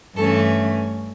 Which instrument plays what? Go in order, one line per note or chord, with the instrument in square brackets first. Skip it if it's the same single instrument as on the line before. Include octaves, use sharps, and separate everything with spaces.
[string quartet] G2 E3 A3 C#4 A4